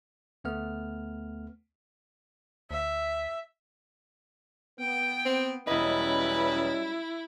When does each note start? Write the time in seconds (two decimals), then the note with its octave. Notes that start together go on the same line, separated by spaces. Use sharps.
0.44 D2 A3 B3 F6
2.71 D2 E5
4.79 B3 G5
5.26 C4
5.67 E1 F#3 G3 C#4 E4 B4 D#5